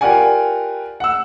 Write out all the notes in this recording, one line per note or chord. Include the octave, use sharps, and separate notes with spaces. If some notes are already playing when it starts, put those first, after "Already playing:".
F4 G4 A#4 D5 F#5 G#5
F#5 E6